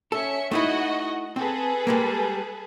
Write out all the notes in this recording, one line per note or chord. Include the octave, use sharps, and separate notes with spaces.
C#4 A4 E5 C#7
A3 D#4 E4 F#4 D#5 F#5
C4 G#4 A4 B4
G3 G#3 A#3